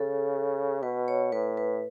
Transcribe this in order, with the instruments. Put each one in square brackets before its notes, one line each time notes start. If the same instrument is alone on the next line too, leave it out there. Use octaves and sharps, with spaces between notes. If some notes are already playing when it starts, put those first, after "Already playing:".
Already playing: [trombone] C#3 [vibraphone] A4
[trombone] B2 [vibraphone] B4
[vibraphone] C#5
[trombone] A2 [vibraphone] B4
[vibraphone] B4